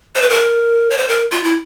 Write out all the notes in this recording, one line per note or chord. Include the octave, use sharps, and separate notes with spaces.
C5
B4
A#4
C#5
C5
A#4
F4
E4